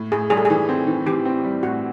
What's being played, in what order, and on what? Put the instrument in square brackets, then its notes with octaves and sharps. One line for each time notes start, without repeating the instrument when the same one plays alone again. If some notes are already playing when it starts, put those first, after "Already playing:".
Already playing: [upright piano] A2
[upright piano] A2 [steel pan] G#4
[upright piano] G3 [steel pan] G#4
[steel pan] A4
[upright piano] E3 [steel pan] G#4
[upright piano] C4
E3
[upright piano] E3 [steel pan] G4
[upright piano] C4
G3
[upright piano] A2 [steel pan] F#4